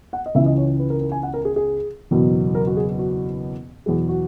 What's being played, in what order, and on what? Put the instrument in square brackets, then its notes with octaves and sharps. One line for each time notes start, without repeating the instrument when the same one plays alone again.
[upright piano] F#5
D#5
C#2 C#3 E3 E5
D#5
C#5
B4
A#4
A#4
G#5
F#5
A#4
G#4
G#4
F#1 E2 B2 F#3
A#4
F#4
G#4
F#4
E2 B2 F#3 G#4
F#4